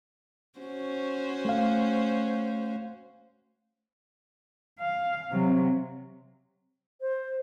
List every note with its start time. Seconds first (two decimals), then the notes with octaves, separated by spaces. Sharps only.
0.59 C#4 F#4 C5
1.45 A3 F5
4.80 F5
5.31 C3 F#3
7.01 C5